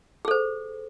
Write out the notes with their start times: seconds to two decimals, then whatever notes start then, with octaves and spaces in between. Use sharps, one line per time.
0.25 G#4
0.28 A4
0.31 C5